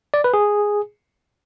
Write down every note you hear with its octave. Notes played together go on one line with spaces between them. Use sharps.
D5
B4
G#4